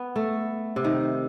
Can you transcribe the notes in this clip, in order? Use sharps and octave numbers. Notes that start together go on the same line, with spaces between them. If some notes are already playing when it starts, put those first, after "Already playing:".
Already playing: B3
A3
C3
D#3